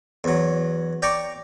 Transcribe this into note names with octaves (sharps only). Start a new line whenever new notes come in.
E2 F#3
D5 G5 A#5 C#6 D6